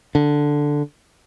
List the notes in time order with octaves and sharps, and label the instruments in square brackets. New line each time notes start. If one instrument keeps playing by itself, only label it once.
[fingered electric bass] D3